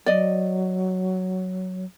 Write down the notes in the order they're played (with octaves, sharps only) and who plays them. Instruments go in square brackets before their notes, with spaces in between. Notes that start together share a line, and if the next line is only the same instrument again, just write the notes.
[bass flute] F#3 [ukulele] D5 D#5